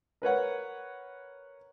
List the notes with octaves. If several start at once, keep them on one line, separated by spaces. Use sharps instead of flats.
A#4 B4 C#5 F#5